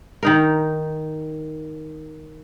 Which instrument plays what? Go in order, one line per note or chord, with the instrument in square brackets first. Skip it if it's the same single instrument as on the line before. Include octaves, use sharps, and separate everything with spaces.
[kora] D#3 D#4 A#4